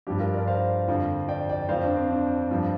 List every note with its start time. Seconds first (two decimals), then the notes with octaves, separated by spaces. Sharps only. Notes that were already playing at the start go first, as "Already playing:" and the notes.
0.07 G2 F3 D4 G4
0.20 F4 A#4
0.33 A#4 D5
0.47 C5 F5
0.88 F2 D3 F3
1.28 D5 G5
1.49 D5 G5
1.69 F2 F3 C5 F5
1.84 D4
1.96 C4
2.11 D4
2.51 G2 F3